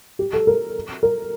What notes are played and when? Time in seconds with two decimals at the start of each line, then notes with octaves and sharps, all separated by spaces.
0.19 G4
0.33 A4
0.47 A#4
1.03 A#4